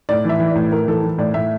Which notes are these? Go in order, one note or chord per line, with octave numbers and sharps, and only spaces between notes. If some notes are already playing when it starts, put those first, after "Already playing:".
A2 D5
E3 E5
E3
D5
A2
A2 A#4
E3 A4
E3
A2 D5
A2 E5